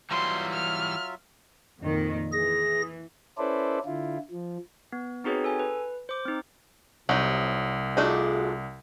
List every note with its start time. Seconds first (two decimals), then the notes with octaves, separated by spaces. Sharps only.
0.11 E3 F#3 G3 F4 E5 C6
0.53 F6
1.80 F2 A#2 D#3
2.32 E3 G#4 A#6
3.38 C#4 E4 A4 B4 C5 D5
3.85 D3 E4 F4
4.30 F3
4.92 B3
5.24 C4 D#4 F#4 G#4 B4 C#5
5.44 A4 G#5
5.59 B4
6.09 C5 D6
6.26 C4 D#4
7.09 C2 C3 F#3 D#4
7.97 A3 D4 D#4 F4 F#4 G#4